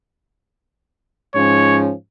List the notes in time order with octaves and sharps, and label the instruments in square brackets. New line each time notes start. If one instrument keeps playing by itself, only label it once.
[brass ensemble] G#2 F3 C#4 [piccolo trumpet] C#5